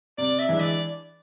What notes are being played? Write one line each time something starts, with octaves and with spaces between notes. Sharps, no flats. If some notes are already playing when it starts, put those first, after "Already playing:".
C3 D5
E5
E3 G#3 D4
D5